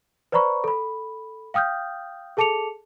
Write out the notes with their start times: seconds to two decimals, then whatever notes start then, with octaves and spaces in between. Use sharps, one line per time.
0.32 B4 C5 D5 A#5 B5 C#6
0.64 A4 B5
1.54 F5 G5 D#6 F6 G6
2.37 G#4 A4 A5 D6 C#7 F7